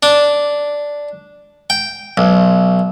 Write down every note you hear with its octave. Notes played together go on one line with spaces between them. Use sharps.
D4
G5
B1